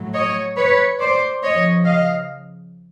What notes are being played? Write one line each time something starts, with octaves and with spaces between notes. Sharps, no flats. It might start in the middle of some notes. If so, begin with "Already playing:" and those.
Already playing: A2 F#3
C#5 D#5
B4 C#5
C5 D5
C#3 F3 C#5 D#5
D#5 F5